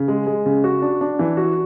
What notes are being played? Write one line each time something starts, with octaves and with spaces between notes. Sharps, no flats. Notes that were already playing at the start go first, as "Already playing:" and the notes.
Already playing: C#3
G#3
G#3
C#3
F#4
D4
D4
E3
F#4